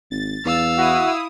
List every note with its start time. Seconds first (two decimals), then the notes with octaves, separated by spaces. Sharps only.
0.11 G#1 A6
0.45 E2 F5 E6
0.78 E4 F#4 D#6